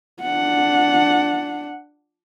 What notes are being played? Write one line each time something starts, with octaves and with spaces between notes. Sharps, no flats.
D4 F#5